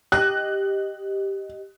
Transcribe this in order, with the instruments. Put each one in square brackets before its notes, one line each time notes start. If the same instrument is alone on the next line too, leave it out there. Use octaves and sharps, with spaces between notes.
[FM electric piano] G4 D#5 [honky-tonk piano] F#6